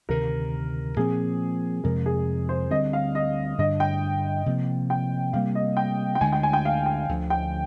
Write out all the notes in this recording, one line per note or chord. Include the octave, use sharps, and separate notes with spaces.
D2 C3 D#3 A#4
A#2 F3 C4 G#4
F2 C3 F3 G#3 A#4
G#4
C5
D2 D3 G3 C4 D#5
F5
D#5
G2 D3 G3 D4 D#5
G5
C3 F3 A#3
G5
C3 G3 A#3 F5
D#5
G5
G5
D2 D3 G#3 G#5
G5
G#5
G5
F5
G5
D2 D3 F3
G5